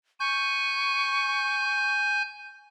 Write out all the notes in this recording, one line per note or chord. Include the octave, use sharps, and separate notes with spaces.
G#5 C#6 G6